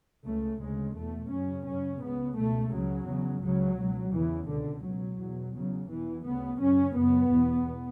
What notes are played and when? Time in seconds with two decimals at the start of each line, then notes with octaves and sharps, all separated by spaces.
0.24 C#2 C#3 A3
0.60 D2 C#3 G#3
0.95 E2 B2 A3
1.30 F#2 C#3 C#4
1.65 F#2 C#3 C#4
2.01 C#2 C#3 B3
2.35 C#2 B2 A3
2.71 C#2 C#3 F#3
3.06 E2 C#3
3.42 C#2 C#3 F#3
3.77 C#2 B2
4.12 E2 C#3 E3
4.47 C#2 B2 D3
4.83 C#2 B2 F#3
5.18 E2 B2
5.53 E2 C#3 F#3
5.88 E2 B2 E3
6.24 D2 C#3 B3
6.59 F#2 C#3 C#4
6.94 F#2 C#3 B3
7.29 E2 B2